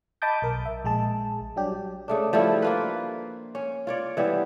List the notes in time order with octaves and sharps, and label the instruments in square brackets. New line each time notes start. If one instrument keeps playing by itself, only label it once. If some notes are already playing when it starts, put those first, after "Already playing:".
[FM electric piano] D#5 A5 B5 D6 D#6 G6
B1 A#4
E5
A#1 G#3 G#4 A5
F#3 G3 D4 G4
[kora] C#3 A3 D4
F3 G3 A3 E4
A#3 F4 B4
C#4
F4 C#5 D5
E3 G3 B3 E5